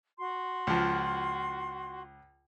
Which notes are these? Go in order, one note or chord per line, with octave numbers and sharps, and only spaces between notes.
F#4 C6
C#2 F3